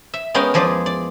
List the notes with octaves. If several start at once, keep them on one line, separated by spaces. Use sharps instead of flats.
E5
G#3 B3 C#4 A#4 F5 G5
E2 F3 G#4 D5
D5